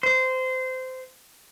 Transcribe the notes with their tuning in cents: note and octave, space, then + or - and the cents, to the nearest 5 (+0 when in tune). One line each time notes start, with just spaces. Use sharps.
C5 -20